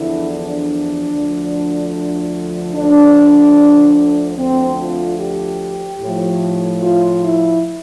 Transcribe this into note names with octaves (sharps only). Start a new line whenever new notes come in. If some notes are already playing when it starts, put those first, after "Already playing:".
Already playing: E2 D3 F3 E4
D4
D2 D3 F3
D2 D3 F3 D4
D2 D3 F3 C4
F4
G4
A2 F3
F4
E4